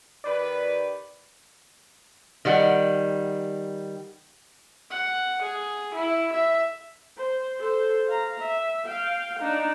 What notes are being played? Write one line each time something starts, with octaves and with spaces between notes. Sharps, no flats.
D#3 G4 B4 D5
D#3 G3 F#5
F#5
G#4
E4
E5
C5
A4 C5
F5 A#5
E5
F5 G5
D4 D#4